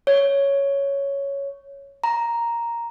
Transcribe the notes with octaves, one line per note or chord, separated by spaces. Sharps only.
C#5
A#5